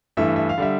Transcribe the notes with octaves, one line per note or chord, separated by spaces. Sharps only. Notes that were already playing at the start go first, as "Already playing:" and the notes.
G2 E3 A3 E5
E5
F5
D3 G3 E5